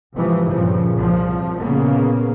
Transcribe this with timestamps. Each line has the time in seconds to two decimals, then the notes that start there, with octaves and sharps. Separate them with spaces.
0.14 G#2 C3 E3 F3
0.50 G2 A#2 C#3 F3
0.94 C2 F3
1.59 A#2 C#3 A#3 B3